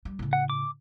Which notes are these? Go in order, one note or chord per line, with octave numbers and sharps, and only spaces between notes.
G3
A2 C#3
F#5
D6